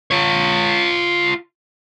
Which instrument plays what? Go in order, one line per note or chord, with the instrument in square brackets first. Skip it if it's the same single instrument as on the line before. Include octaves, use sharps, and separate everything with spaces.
[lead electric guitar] F4 C#5